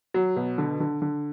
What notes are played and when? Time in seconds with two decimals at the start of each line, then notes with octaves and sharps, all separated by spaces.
0.14 F#3
0.36 B2
0.58 D3
0.80 D3
1.02 D3